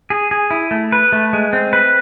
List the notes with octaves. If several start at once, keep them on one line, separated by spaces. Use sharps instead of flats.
G#4
G#4
E4
A3
B4
A3
G#3
C4
B4